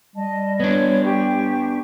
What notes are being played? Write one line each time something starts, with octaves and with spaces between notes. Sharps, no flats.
G3 D#5 A5
B3 D4 C#5
G4 C#6